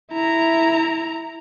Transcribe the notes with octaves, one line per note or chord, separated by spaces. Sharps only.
E4 A#5